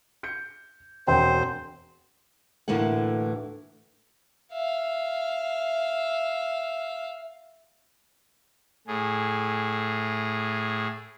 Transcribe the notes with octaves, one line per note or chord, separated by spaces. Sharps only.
G6 C#7
E1 C4 C5 G5
D2 A2 D3 E3 A#3 F#5
E5 F5
A2 G#4